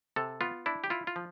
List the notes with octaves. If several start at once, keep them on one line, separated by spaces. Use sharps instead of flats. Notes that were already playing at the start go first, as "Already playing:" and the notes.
C3 A4
B3 F4
D4 E4
G4
E4 F4
F4
F3